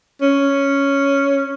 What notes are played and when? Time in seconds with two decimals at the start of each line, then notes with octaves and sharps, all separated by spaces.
0.22 C#4